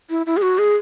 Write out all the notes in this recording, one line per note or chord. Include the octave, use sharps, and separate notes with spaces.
E4
E4
G#4
F#4
G#4